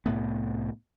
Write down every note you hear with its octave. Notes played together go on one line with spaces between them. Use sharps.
C2 A2 A3 B3